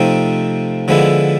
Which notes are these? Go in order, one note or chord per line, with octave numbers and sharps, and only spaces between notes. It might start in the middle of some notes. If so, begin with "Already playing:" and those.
Already playing: C3 F3 A3 C4 D#4
D3 F3 G#3 B3 E4